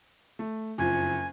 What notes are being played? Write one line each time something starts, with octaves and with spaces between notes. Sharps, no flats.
A3
F#1 F2 G#5